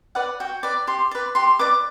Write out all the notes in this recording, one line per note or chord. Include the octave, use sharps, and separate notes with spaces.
B4 D5 F#5
F#4 G5
B4 D5
G4 C6
B4 D5
G4 C6
B4 D5 D6